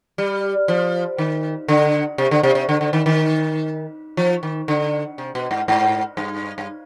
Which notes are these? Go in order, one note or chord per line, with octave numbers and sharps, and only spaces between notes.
G3
F3
D#3
D3
C3
D3
C3
C3
D3
D3
D#3
D#3
F3
D#3
D3
C3
B2
G#2
G#2
G2
G2